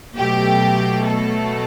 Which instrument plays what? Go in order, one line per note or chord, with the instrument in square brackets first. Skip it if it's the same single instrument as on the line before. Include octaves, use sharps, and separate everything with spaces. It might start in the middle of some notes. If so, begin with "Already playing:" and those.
[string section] B2 F#3 A3 G4
A4